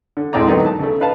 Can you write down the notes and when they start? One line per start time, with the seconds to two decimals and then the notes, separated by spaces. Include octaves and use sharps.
0.17 D3
0.33 D2 A2 G#3 C4 D5 A#5
0.48 D#3 F#3 A3 B3 D#4
0.66 A5
0.79 C#3 A3
1.00 D#4 B4 F5 A5